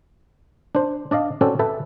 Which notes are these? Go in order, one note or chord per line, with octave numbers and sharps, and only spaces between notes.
D4 C5
D4 D5 D#5 F5
C4 C#4 F#4 A4 C5 D5
A4 B4 E5 G5 A5